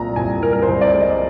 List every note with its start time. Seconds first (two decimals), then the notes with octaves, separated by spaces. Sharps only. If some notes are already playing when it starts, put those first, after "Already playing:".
Already playing: C2 A#2 A#5
0.16 C2 G#5
0.42 C2 A#4
0.53 A#4
0.62 C5
0.68 C2
0.81 D5
0.94 G#3
1.01 D#5